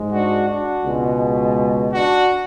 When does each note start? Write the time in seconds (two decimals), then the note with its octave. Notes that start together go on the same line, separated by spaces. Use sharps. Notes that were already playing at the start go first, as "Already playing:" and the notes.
Already playing: G#2 G#3
0.12 D4 F#4
0.48 D4 F#4
0.85 C#2 B2 G#3
1.93 D4 F#4